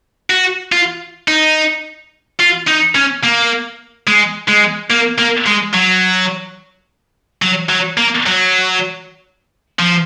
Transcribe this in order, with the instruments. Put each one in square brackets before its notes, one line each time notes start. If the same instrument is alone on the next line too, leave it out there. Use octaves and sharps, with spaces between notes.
[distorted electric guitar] F#4
F4
D#4
F4
D#4
C#4
A#3
G#3
G#3
A#3
A#3
G#3
F#3
F#3
F#3
A#3
F#3
F3